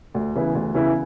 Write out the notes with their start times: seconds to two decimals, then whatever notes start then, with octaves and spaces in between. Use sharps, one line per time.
0.14 D2
0.35 C#3 E3 B3 E4
0.55 D2
0.74 C#3 E3 B3 E4